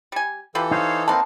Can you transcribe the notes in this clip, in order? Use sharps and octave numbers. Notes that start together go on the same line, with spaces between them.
G3 G#5
E3 F4 G4 A4 B4
D#4 C5 C#5 F5
A#3 C4 D#4 B4 F5 A5